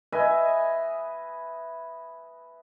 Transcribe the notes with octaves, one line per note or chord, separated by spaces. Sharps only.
B4 D#5 E5 G#5